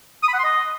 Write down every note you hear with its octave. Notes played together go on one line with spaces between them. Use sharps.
D#6
B5
F#5
C6
D#5